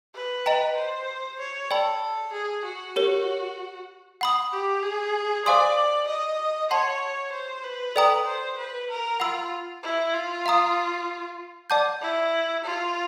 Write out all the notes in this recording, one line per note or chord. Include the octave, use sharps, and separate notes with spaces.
B4
D#5 G5 A#5
C5
C#5
A4 D5 G5 B5
G#4
F#4
G4 A#4 C#5
F#5 B5 D#6
G4
G#4
C5 D5 F5 G#5 C6 D#6
D#5
C#5 F#5 A5 C6
C5
B4
A4 D5 G5 A#5 D#6
C5
B4
A#4
F4 F#5 B5 E6
E4
F4
F5 A#5 D#6
D5 F#5 A5 D6 G6
E4
F4